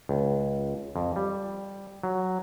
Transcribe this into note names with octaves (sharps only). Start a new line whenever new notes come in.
C#2
F2
G3
F#3